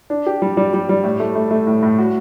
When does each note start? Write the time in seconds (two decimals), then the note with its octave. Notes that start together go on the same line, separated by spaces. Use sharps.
0.10 D4
0.27 G4
0.42 G3
0.57 G3
0.74 G3
0.89 G3
1.04 A2
1.20 A3
1.35 A3
1.51 A3
1.67 A2
1.83 A2
1.98 F#4